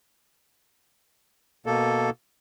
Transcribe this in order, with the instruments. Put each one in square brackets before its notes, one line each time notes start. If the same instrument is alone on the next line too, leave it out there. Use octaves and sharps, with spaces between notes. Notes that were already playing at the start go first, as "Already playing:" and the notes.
[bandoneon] B2 A#3 A4